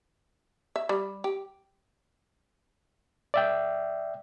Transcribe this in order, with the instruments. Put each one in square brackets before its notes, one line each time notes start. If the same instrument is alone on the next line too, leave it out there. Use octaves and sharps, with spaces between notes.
[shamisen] E5
G3
G4
[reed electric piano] D5 E5 G5